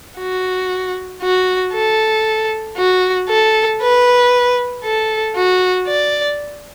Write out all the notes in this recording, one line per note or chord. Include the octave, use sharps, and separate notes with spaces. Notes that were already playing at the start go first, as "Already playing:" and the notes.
F#4
F#4
A4
F#4
A4
B4
A4
F#4
D5